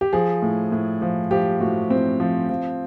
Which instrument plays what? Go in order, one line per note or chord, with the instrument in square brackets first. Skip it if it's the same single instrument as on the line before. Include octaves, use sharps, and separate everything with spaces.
[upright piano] G4
F3 G#4
A2
A2
F3
F3 G4
A2 F#4
A2 C4
F3
F3